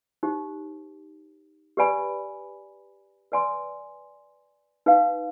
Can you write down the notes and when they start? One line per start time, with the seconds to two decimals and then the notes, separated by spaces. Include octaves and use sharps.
0.23 D#4 G4 C5
1.77 G4 B4 D5 G#5 B5
3.32 B4 D5 G#5 C6
4.86 D#4 B4 F5